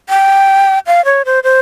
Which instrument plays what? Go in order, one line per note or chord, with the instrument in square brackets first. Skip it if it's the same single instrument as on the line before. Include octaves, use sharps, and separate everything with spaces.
[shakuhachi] G5
F5
C#5
C5
C5